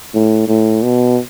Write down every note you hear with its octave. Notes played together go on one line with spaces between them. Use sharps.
A2
A2
B2